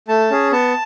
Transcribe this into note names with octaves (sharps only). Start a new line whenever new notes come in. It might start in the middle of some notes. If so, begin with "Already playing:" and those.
A3 A5
C#4 G#4
B3 A5